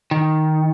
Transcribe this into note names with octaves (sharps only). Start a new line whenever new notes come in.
D#3